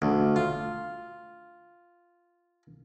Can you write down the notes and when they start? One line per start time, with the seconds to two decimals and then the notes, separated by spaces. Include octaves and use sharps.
0.02 D2
0.36 F4